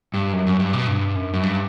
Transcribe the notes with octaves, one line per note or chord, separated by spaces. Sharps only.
G2
F#2
F#2
G2
B2
G2
F#2
F#2
G2